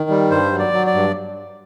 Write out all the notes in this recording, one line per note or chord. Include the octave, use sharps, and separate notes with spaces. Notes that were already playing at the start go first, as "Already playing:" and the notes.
Already playing: D#3
G3
G2 C5
F#3
D5
F#3
D5
G2